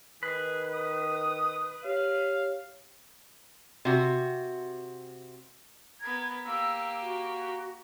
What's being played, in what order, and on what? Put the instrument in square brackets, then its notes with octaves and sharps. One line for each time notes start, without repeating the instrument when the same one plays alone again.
[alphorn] D#3 [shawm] G#4 [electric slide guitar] B4
[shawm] D#6
[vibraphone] G4 C#5 [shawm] F5
[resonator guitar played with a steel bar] C3 F#4
[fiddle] B3 A#4 [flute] G#6
[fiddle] A#3 G4 [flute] E6
[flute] F#4